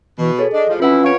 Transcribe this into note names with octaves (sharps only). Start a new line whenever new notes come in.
B2 E3
G#4 A4 C#5
D4 D#5
A2 F3
F2 E3 C#4 E4 F4 B4 F#5
F2 B3 C#5 F5 D7